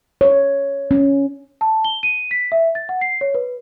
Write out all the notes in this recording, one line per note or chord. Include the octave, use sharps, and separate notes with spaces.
C#5
C#4
A5
G7
D#7
B6
E5
A6
F#5
C7
C#5
B4